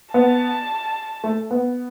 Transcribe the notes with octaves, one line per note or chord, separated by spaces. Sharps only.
B3 A5
A3
B3